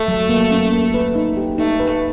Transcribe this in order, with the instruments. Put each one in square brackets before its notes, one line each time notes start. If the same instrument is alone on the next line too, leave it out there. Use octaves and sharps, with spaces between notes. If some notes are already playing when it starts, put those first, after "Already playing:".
Already playing: [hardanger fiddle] A3
[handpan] F#3
A#3
C#4
A#3
B4
D#4
G4
[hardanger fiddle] A3 [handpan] D#4
[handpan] B4